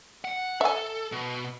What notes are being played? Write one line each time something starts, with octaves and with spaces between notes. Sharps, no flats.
F#5
A4 E5 G#5
B2